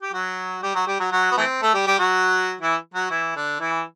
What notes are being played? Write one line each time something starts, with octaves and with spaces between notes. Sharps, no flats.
G4
F#3 F#4
G3 G4
F#3 F#4
G3 G4
F#3 F#4
F#3 F#4
B3
E3 A3 C4
A3 A4
G3 G4
G3 G4
F#3 F#4
E3 E4
F#3 F#4
E3 E4
D3 D4
E3 E4